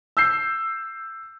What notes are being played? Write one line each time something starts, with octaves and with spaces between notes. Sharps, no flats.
E6 G6 C7